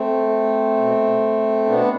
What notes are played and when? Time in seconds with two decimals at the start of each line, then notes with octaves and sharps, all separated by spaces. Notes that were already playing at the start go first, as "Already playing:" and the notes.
Already playing: A3 C4
0.77 B2
1.65 B2 B3 D4